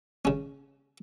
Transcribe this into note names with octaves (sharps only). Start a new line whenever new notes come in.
C#3 C#4